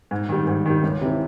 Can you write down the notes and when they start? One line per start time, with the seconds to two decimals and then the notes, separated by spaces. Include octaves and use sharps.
0.11 G#2
0.29 D#3 G3
0.47 G#2
0.66 D#3 G3
0.83 C#2
1.01 C3 E3